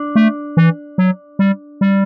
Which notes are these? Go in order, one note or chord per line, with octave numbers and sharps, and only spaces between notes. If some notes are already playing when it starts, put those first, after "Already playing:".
Already playing: D4
A3
E3
F#3
G3
G3